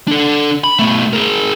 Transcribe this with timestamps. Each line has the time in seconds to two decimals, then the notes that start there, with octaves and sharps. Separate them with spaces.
0.08 D4 A4
0.64 B5
0.79 B2 A3
1.13 G#4 A#4